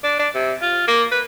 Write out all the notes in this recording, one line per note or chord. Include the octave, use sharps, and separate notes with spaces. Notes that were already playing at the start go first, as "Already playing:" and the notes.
D4
D4
C3
F4
A#3
B4